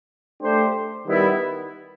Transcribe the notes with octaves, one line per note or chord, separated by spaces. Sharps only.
A3 D4 G4 C5
D#3 G3 B3 E4